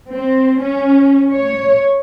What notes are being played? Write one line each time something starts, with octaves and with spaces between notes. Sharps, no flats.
C4
C#4
C#5